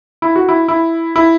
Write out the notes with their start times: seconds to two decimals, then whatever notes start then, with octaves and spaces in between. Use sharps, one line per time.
0.22 E4
0.36 F#4
0.49 E4
0.68 E4
1.16 E4